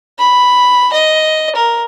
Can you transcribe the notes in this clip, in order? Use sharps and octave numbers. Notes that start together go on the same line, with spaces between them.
B5
D#5
A#4